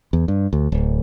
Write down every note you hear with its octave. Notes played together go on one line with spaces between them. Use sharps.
E2
G2
D2
D1